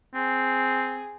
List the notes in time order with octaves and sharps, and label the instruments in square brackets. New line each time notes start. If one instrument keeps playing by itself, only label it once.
[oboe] C4 [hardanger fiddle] G#4